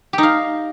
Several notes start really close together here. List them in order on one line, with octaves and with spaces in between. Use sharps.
G4 D#4 F5